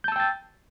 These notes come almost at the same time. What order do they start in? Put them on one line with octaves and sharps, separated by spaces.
G6 A5 E6 G5 A6